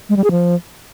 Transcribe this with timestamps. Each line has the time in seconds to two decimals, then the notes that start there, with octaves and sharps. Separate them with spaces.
0.09 G#3
0.17 G3
0.24 G#4
0.31 F3